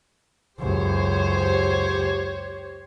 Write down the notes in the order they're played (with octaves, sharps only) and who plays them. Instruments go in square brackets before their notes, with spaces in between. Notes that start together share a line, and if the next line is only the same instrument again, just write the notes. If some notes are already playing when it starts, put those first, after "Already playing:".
[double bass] C#2 F#2 [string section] G4 C5 C#5